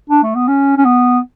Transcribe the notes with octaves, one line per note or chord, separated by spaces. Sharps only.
D4
A3
B3
C#4
C#4
B3